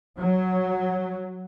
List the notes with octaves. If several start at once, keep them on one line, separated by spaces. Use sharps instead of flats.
F#3